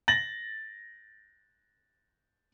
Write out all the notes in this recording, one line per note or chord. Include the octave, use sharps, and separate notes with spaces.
A6 A#6 F#7